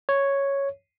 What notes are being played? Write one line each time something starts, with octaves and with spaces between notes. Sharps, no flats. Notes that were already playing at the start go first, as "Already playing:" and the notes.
C#5